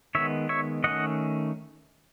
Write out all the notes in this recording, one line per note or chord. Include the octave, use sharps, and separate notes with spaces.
D#3 G#3 B3 C#5 E5
C#5 E5
D#3 A3 C#4 D#5 F#5